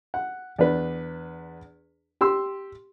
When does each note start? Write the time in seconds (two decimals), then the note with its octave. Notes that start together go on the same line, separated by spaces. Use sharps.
0.14 F#5
0.58 E2 D4 B4
2.21 G4 C6 E6